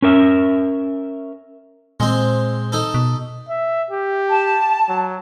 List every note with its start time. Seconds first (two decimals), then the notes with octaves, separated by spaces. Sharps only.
0.02 C#4 A#4 E5
2.00 A#2 G#3 C4
2.72 D#4 A4
2.94 B2
3.49 E5
3.91 G4
4.29 A5
4.89 F#3